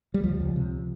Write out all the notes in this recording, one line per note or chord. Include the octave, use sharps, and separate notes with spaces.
G3
C#2 F3
C#2
C3